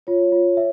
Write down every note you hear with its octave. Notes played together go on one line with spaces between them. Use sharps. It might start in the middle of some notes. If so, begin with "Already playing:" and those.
F4 C#5
F4
E5